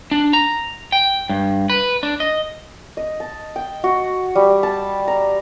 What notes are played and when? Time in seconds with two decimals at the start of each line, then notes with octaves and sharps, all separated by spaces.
0.11 D4
0.33 A#5
0.92 G5
1.30 G2
1.70 B4
2.03 D4
2.20 D#5
2.97 D#5
3.20 A5
3.56 G5
3.84 F#4
4.35 G3
4.63 A5
5.07 A#5